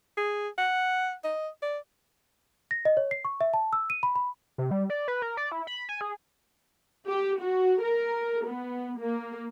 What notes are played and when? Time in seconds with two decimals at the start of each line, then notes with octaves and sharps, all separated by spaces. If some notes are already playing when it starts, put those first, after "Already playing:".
0.17 G#4
0.58 F#5
1.24 D#5
1.62 D5
2.71 A#6
2.85 D#5
2.97 C#5
3.11 C7
3.25 C#6
3.41 E5
3.54 A5
3.73 E6
3.90 D#7
4.03 B5
4.16 B5
4.58 C3
4.71 G3
4.90 D5
5.08 B4
5.22 A#4
5.37 D5
5.52 E4
5.67 B5
5.89 G#5
6.01 G#4
7.08 G4
7.41 F#4
7.82 A#4
8.45 B3
9.00 A#3